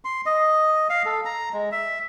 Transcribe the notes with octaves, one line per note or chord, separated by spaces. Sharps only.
C6
D#5
F5
A4
A#5
G#3
E5